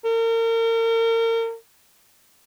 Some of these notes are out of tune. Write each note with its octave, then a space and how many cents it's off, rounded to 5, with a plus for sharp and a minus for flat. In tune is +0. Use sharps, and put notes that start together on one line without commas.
A#4 -35